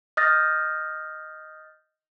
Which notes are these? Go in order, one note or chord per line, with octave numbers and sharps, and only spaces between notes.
D#5 D#6 F6 G6 A6 A#6